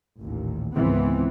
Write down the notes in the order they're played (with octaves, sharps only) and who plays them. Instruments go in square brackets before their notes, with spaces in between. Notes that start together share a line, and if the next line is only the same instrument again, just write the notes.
[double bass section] A1 D#2 A#2
C#2 G#2 D#3 E3 B3 C4